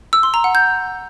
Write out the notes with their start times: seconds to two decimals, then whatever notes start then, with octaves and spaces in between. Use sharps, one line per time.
0.13 E6
0.23 C6
0.34 A#5
0.44 F#5
0.55 G6